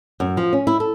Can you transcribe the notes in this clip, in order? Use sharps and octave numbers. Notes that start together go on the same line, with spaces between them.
F#2
F3
C#4
E4
A4